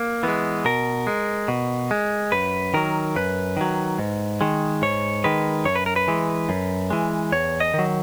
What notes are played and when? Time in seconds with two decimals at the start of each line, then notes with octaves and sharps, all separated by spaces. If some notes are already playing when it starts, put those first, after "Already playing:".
Already playing: A#3
0.23 E3 G#3 B3
0.65 B2 A#4
1.07 G#3
1.48 B2
1.91 G#3
2.32 F#2 B4
2.74 D#3 F#3 A#4
3.16 F#2 B4
3.57 D#3 F#3
3.99 G#2
4.41 D#3 G#3
4.82 G#2 C#5
5.24 D#3 G#3 B4
5.65 F#2 C#5
5.76 B4
5.86 A#4
5.96 B4
6.08 E3 G#3
6.49 F#2
6.90 E3 G#3
7.32 E2 C#5
7.60 D#5
7.74 D#3 F#3